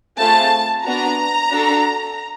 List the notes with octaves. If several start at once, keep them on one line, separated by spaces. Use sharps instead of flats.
A3 C4 F4 G#4 A5
B3 D4 F#4 A#5
D4 F#4 A4